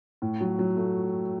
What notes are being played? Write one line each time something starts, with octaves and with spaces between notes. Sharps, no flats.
A2
F#3
F#3
A3